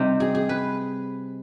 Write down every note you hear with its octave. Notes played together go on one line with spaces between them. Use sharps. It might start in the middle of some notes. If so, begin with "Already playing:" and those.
Already playing: C3 G3 C4 D#4
G#4
G#4
B4